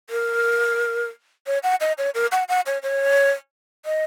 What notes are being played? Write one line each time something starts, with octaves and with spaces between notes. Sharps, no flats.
A#4
C#5
F#5
D#5
C#5
A#4
F#5
F#5
C#5
C#5
D#5